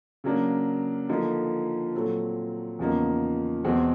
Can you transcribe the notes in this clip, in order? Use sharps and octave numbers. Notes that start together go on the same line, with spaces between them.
C#3 F#3 A#3 D4
D3 F3 A#3 D#4
A#2 F#3 A3 C4
E2 C#3 F3 A#3 D#4
E2 B2 G#3 C4